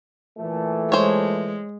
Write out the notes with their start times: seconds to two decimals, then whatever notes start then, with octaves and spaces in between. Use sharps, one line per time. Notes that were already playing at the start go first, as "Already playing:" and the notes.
0.39 A#2 E3 A3
0.92 G#3 C5 C#5